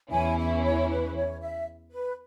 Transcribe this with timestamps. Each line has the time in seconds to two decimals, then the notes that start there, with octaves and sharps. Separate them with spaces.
0.11 E2 E3 C#4 E4 G#5
0.38 E5
0.63 C#5
0.89 B4
1.15 C#5
1.41 E5
1.91 B4